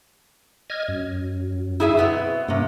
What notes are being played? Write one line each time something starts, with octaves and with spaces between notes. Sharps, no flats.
D#5 F6 G#6
F#2
E4 G#4 E5
B2 B3 C4
G2 C3 A#3 C#4